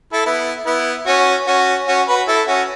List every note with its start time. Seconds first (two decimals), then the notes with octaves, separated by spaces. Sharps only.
0.13 E4 A4
0.26 B3 E4
0.66 B3 E4
1.06 C#4 F#4
1.47 C#4 F#4
1.88 C#4 F#4
2.08 F#4 B4
2.28 E4 A4
2.47 C#4 F#4